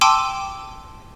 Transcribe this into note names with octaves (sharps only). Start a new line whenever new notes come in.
G5 A5 C6 D6 E6 D#7